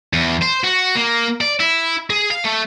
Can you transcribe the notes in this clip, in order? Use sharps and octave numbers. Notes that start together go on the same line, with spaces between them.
E2
C5
F#4
A#3
D5
E4
G#4
F5
A3